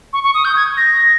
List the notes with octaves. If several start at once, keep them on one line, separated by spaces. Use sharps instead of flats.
C#6
C#6
D#6
G6
G#6
A#6